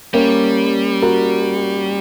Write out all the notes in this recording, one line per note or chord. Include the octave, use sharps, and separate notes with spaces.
G3 A#3 C#4
F#4 A#4